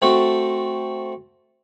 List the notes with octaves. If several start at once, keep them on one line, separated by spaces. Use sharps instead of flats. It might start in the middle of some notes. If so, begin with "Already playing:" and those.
A3 C4 F#4 A4